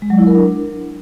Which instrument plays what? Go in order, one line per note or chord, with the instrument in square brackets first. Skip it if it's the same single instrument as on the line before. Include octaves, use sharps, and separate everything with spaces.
[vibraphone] G#3
F#3
E4
A#4
D4